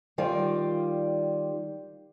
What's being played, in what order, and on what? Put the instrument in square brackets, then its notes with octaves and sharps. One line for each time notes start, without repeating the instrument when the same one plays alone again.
[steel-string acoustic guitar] D#3 G3 F4 D5